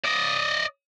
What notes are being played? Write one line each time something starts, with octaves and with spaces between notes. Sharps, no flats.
D5 D#5